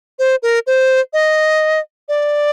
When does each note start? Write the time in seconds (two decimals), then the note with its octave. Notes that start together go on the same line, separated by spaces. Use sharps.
0.19 C5
0.43 A#4
0.67 C5
1.13 D#5
2.09 D5